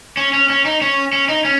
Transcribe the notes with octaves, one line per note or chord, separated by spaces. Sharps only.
C#4
C#4
C#4
D#4
C#4
C#4
D#4
C#4